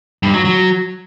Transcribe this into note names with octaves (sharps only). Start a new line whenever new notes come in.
G2
F#3
F#3